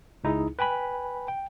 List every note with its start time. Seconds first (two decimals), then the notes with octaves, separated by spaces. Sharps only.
0.24 C#2 D#4 E4 G#4
0.59 B4 G5 G#5 B5
1.28 G5